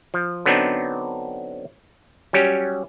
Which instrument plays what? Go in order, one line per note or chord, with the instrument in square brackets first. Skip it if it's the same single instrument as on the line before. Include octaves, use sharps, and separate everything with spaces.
[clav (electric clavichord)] F3
D3 F#3 B3 C4 D4 D#4
F#3 G3 C#4 G4